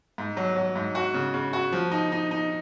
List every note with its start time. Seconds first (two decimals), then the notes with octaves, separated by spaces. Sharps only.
0.18 G#2
0.37 F#3
0.56 F#3
0.76 G#2
0.95 F#4
1.14 C#3
1.34 C#3
1.53 F#4
1.72 F3
1.92 D#4
2.12 D#4
2.31 D#4